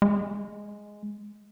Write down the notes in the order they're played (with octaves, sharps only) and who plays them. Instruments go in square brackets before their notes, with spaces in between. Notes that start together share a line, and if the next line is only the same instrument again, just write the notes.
[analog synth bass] G#3